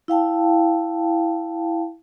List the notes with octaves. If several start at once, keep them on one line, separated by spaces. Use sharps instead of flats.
E4 F5 G5 A5